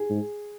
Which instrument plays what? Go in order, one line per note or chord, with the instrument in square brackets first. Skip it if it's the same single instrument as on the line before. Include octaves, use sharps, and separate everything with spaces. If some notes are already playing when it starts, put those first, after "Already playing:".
Already playing: [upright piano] G#4
[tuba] G#2